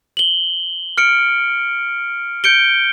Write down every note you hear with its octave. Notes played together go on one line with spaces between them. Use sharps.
F#7 G7
F6 C#7 D7
G6 C#7 D7 G7